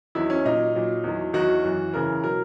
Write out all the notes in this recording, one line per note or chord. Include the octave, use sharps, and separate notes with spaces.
E2 D#3 F#3 E4
C#4
A#2 F#3 D#4
A#2 F#3
E2 D#3 F#3
E2 D#3 F#3 F#4
F#2 E3
E2 C#3 E3 A#4
B2 F#3 A#4